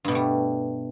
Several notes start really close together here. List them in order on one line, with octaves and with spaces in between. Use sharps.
G2 B2 A3 G3